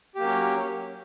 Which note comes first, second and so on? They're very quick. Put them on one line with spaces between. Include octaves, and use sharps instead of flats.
G4 A#3 F#3 C#4